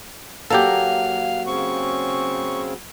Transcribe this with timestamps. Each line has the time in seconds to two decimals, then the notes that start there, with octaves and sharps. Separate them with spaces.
0.50 F#3 A#3 G4 A4 F5
1.46 C#3 C4 C#6